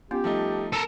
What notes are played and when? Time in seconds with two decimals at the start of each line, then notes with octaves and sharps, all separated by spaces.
0.11 B3 C#4 F4 G4
0.24 F3 G3 A3 D#4
0.73 A4 A#4